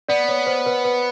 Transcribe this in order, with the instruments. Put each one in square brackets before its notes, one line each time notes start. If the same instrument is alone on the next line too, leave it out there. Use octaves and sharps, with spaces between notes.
[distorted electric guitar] B3 [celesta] D5
[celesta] C#5
C5
B4
B4